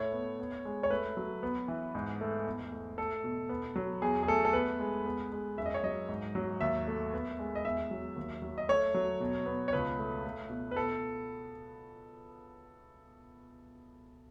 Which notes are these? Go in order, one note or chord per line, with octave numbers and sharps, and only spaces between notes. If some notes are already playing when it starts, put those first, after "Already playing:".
Already playing: A2 A3 C#5
B3
B3
G#3
C#5
A3 B4
F#3
B3
E3
G#2
A3
E2
A3
A3 A4
B2
B3
F#3
E2 G#4
G#4
A3 A4
A4
B3 B4
G#3
B3
G#3
F#2 E5
D#5
C#5
F#3 D#5
G#2
F#3
D#2 E5
A3
B3
G#3
D#5
E2 E5
F#3
D#2
F#3
D#5
A3 C#5
F#3
B2
B3
C#5
C#2 B4
A3
A3
B2
B4
B3 A4